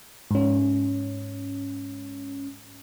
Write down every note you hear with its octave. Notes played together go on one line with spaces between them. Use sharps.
G#2 C#4